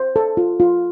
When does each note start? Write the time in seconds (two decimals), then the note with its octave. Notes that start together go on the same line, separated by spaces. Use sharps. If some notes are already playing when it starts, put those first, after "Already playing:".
Already playing: C5
0.16 A4
0.37 F4
0.60 F4